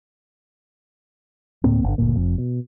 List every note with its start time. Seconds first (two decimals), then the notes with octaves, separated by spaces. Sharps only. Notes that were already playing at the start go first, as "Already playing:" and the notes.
1.64 D2 A2 A#3 C4
1.84 G1 D3
1.98 F#1 D2 A#2 A#3
2.16 F1 F2
2.38 B2